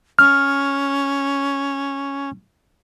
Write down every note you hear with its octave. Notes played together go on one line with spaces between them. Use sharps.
C#4 F6